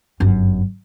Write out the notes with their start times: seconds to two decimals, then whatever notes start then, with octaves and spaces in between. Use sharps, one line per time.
0.20 G1 F#2